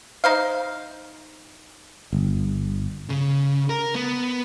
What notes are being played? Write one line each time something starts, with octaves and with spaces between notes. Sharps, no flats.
D#4 C5 F5
G1
C#3
A#4
B3